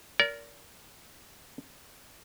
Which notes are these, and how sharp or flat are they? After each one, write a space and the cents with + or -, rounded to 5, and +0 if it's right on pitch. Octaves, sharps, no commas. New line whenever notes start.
A#4 +0 D5 -35